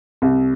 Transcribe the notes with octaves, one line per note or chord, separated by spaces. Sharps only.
C2